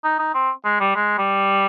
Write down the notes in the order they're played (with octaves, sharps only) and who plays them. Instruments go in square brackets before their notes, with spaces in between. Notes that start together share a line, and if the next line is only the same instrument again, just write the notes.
[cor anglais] D#4
D#4
C4
G#3
G3
G#3
G3